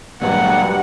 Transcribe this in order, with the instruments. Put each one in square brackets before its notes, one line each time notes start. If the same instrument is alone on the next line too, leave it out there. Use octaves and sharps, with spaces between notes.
[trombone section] G2 [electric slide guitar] A#2 F#3 G#3 [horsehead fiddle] F#5